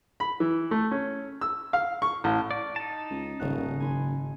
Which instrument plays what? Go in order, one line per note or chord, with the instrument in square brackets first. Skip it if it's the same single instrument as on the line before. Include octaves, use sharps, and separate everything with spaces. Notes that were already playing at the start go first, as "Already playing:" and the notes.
[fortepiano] B5
E3
A3
C#4
E6
F5
C#6
A1
[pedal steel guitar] D5
D#4 A5
[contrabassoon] C#2
[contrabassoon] D#1 [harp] G#1 C#3 F#6
[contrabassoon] F#1 [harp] G#5 B5 C6